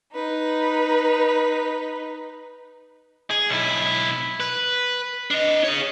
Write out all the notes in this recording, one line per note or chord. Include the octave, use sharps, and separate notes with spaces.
D#4 B4
G#4
B1 E4
B4
D4 D#5
G#4 C#5